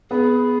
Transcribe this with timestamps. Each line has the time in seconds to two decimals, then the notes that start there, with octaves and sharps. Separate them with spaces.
0.10 B3 G#4